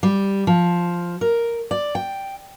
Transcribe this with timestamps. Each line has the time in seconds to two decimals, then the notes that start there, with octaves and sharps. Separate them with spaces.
0.03 G3
0.47 F3
1.21 A#4
1.71 D5
1.95 G5